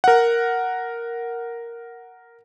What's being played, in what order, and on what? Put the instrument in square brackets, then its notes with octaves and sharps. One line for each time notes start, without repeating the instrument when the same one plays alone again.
[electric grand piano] A#4 F#5